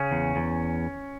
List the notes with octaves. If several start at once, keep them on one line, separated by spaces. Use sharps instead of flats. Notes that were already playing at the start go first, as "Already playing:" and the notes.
Already playing: C#3 C#4
E2
E2